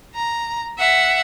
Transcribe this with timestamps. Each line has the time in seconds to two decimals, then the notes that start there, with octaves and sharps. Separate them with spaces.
0.15 A#5
0.78 E5 F#5